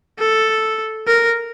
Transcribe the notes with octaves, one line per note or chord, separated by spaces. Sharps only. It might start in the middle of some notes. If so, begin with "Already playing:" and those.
A4
A#4